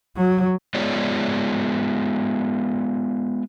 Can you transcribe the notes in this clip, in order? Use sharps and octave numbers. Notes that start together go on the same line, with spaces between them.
F#3
G#3 B3 F4 G#4 C#5 D5